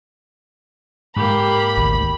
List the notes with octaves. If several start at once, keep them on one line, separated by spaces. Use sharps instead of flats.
G#2 A#3 G4 B5
G#1 D2 D#3